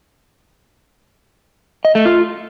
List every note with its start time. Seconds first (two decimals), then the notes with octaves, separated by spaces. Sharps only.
1.85 D#5
1.95 A3
2.06 F4